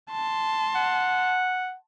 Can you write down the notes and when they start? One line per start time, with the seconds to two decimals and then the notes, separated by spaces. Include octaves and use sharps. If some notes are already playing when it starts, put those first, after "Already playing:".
0.11 A5 C6
0.75 F#5